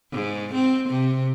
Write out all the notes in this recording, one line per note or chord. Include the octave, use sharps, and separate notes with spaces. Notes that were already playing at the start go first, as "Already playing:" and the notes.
G#2
C4
C3